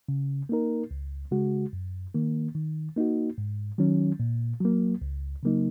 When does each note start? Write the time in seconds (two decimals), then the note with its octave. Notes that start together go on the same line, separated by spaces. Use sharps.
0.09 C#3
0.49 A#3 D#4 A#4
0.91 C#2
1.31 C#3 G#3 F#4
1.73 F#2
2.15 D#3 A#3
2.55 D#3
2.96 A#3 D#4 F#4
3.38 G#2
3.78 D#3 F#3 C#4
4.20 A#2
4.61 F#3 A#3
5.02 C#2
5.43 C#3 F#3 A#3 D#4